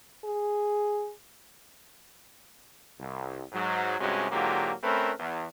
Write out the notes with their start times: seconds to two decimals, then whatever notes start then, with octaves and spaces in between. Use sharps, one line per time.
0.24 G#4
3.00 C2
3.52 G#2 F#3
3.99 C2 G2 C3 G#3 C#4 F#4
4.31 G#2 D3 F#3 A#3 F4 G4
4.84 A3 C4 C#4 A#4 B4
5.19 E2